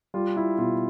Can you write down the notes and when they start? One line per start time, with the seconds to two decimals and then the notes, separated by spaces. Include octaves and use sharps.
0.14 G3 F4
0.36 E4
0.58 B2 F4